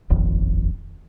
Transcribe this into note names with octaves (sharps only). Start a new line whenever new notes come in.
D#1 G#1 F2